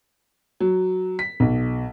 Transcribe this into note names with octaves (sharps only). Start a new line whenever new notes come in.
F#3
B6
B1